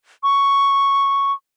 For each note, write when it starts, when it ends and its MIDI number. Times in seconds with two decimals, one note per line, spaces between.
0.23 1.32 85